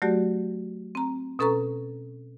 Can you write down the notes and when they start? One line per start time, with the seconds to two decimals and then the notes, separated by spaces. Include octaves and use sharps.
0.02 F#3 A3 F#4 G4 D5
0.95 C4 A#5
1.39 B2 C#4 A4 B4 A#5 C#6